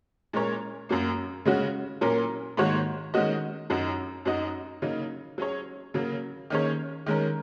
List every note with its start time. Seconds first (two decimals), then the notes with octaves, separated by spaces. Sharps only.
0.33 A#2 G#3 C#4 A#4 C#5
0.89 F#2 F#3 A#3
1.45 C#3 G#3 C#4 F#4
2.01 A#2 F#3 C#4 A#4
2.57 G#2 D#3 A#3 F#4 C#5
3.14 D#3 G#3 C#4 F#4 D#5
3.70 F#2 F#3 D#4 F#4
4.25 F#2 F#3 D#4 F#4 D#5
4.82 C#3 F#3 A#3 D#4
5.38 F#3 C#4 G#4 C#5
5.94 C#3 F#3 A#3
6.50 D#3 A#3 C#4 G#4 C#5
7.06 D#3 G#3 C#4 A#4